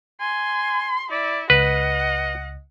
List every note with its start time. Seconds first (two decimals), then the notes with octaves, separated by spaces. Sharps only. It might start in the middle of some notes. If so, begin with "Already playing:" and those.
0.21 G#5 C6
1.11 E4 D5
1.50 C#2 B4 D#5 F#5